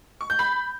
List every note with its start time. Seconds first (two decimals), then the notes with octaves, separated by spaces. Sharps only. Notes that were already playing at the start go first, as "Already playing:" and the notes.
0.21 C#6
0.30 G6
0.39 B5